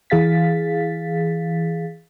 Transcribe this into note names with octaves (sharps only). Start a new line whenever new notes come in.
E3 G#4 F5 A6 B6